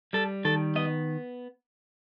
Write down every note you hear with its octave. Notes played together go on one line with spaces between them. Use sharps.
G3 A4
D#3 A4
B3 D#5